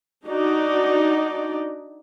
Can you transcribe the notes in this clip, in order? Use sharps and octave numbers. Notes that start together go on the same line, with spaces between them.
D4 D#4 F#4 D5